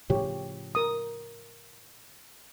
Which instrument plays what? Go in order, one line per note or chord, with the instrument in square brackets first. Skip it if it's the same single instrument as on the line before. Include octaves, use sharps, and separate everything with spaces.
[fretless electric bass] A2 C#3 F3 [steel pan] G4 C#5
[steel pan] A#4 D#6